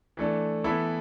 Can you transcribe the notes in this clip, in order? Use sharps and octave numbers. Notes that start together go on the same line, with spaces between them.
E3 A3 D4 A4
E3 B3 E4 A4